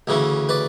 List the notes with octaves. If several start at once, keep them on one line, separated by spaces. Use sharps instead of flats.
D2 C#3 E3
B4 D5